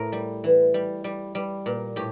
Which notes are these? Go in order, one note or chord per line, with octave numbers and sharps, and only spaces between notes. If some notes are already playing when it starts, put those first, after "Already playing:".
Already playing: A2 A#4
G3
E3
G3
G3
G3
A#2
A2 G4